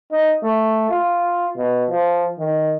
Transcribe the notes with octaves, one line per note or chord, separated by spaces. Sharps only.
D#4
A3
F4
B2
F3
D#3